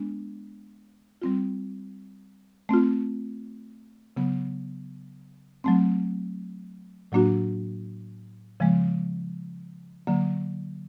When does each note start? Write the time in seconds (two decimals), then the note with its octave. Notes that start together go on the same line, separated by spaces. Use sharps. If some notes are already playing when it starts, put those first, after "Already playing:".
Already playing: G#3 B3 D4
1.22 G3 C4 F4
2.69 A3 C4 F4
4.16 C#3 F#3 B3
5.64 F#3 A3 C4
7.12 A2 F#3 A#3 D4 F#4
8.60 C#3 F3 G#3 B3
10.07 D3 F#3 A#3